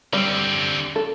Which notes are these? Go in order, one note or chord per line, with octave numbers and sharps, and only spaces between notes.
D3 G3 C4
A4